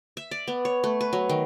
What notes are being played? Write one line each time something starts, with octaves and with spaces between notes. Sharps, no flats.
E5
D5
B3
C#5
A3
B4
F#3
D#3